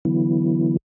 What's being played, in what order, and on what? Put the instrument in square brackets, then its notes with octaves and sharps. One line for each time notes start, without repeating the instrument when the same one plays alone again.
[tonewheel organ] D3 E3 F#3 B3 E4